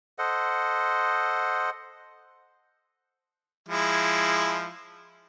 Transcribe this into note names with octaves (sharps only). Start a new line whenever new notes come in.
A4 C5 D#5 F#5
F3 G#3 E4